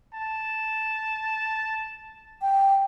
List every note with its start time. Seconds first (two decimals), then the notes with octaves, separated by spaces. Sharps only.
0.13 A5
2.41 G5